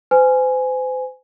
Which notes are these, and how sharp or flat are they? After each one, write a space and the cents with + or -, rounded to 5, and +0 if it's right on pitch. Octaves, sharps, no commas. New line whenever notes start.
C5 -40 G#5 +5